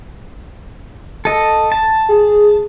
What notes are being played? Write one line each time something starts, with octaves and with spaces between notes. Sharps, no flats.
A4 D#5
A5
G#4